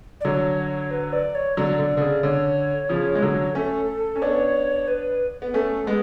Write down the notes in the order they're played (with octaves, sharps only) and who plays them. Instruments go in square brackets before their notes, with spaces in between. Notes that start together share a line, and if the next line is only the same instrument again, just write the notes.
[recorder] D5
[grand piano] D3 F#3 [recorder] C#5
[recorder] B4
D5
C#5
[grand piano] D3 F#3 [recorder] D5
[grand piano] D3
D3
C#3
[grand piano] D3 [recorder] C#5
[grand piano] C#3 F3
G#3
D3 F#3
[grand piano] A3 C#4 [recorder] A4
[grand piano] C#4
[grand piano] B3 D4 [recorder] C#5
[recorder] B4
[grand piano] B3
[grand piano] A3 C#4 [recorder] A4
[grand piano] G#3 B3 [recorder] G#4